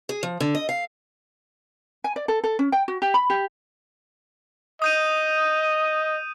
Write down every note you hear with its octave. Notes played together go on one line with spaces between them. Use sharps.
G#4
F3
D3
D#5
F5
G#5
D5
A4
A4
C#4
G5
F#4
G4
B5
G4
D#5 D#6 G6 D#7